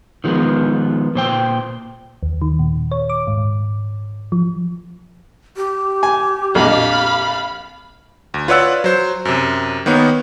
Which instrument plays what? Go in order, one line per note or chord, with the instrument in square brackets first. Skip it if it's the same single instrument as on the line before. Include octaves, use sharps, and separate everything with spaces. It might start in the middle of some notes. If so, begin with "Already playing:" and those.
[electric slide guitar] D#3 F3 G#3 B3
A#2 C5 G5
[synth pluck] D#2
D#3
A#2
C#5
D6
G#2
F3
[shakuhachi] G4
[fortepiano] G#5
[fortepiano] A#1 F2 D#5 [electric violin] F5 B5
[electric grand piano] D2
F4 B4 C#5 D5 F#5 E6
F#3 C5
F#2 C3
D#3 A#3 B3 C#5